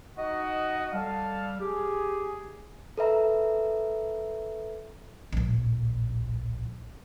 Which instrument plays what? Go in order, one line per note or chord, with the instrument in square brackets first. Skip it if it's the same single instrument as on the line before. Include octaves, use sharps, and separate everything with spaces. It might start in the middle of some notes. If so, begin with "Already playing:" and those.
[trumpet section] D#4 F#4 [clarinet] D#5
[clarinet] G3 [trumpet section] A4 F5
[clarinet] G4 [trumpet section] G#4
[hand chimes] A4 B4 E5 A#5
[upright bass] D1 A#1